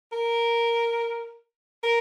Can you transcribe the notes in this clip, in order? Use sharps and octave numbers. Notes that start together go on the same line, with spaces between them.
A#4
A#4